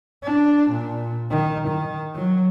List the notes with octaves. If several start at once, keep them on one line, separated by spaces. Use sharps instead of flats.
D4
A#2
D#3
D#3
F#3